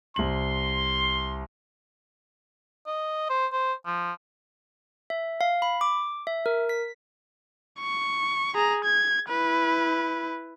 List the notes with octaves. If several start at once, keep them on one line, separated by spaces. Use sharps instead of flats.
C2 C6 F#7
D#5
C5
C5
F3
E5
F5
B5
D6
E5
A#4
B6
C#6
G#4 A#5
G#6
E4 B4